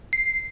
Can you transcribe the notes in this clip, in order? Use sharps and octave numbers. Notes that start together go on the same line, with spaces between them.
C7